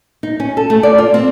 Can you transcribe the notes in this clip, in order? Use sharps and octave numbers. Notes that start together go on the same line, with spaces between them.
D#4
C#4
A4
A3
D5
F4
C4